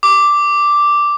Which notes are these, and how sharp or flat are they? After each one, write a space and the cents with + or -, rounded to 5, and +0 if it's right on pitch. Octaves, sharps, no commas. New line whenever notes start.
D6 +0